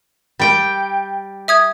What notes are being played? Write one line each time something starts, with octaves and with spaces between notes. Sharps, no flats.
G3 G5
E5 D#6 G#6